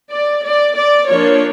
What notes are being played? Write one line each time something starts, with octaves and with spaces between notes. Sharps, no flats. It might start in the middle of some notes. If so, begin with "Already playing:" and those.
D5
D5
D5
F3 A#3 D4 C#5